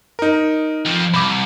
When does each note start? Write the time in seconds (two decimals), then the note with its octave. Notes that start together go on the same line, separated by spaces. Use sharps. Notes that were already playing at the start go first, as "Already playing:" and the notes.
0.19 D#4 A#4
0.85 F2 F3
1.14 C2 B5 D6